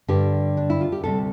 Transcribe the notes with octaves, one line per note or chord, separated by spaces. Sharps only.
G2 D3 G3 G4
D4
E4
F4
G4
D2 C3 G3 A4